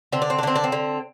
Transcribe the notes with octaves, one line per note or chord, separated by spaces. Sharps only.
D3 C4
D4
C4
D4
D3 C4
D4
C4
D3